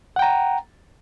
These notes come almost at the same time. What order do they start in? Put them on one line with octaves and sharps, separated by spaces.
F#5 G5 A#5